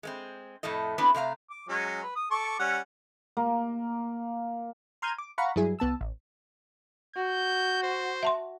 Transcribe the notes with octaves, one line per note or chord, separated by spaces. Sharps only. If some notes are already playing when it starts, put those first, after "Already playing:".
G#3 A#3 C4
F2 A2 A3 A4 D#5
B3 C4 D4 E4 B4
C3 A3 F5 A#5
D6
F#3 G#3 C#4
B4
D#6
A4 C#6 D6
G3 C#4 F#5
A#3
A#5 C6 F6 G6 G#6 D#7
D6
F5 F#5 A#5 B5 C#6
G2 F#3 E4 G#4
C2 B3 A5 E6
A1
F#4 G6
C5
E5 A5 C6